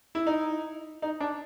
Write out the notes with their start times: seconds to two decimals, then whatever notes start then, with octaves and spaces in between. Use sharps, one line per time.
0.15 E4
0.27 D#4
1.02 D#4
1.20 D4